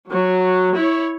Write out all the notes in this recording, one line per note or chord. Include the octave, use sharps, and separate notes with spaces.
F#3
E4 C#5